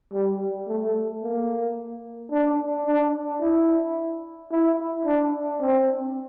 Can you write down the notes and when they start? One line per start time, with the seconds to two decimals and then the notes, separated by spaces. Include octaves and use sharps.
0.13 G3
0.68 A3
1.23 A#3
2.31 D4
2.86 D4
3.41 E4
4.51 E4
5.05 D4
5.61 C4